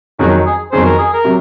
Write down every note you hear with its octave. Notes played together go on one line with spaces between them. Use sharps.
F2 D#3 F#3 C#4 F#4 G#4
G#4
F2 D#3 F#3 C#4 G#4 C5
A#4
G#4
A#4
C3 F#3